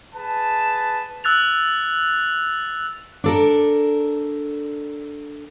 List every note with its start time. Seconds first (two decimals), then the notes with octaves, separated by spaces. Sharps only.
0.14 G#4 B4 A5
1.24 E6 F#6 A6 F7
3.24 D4 A4 A#4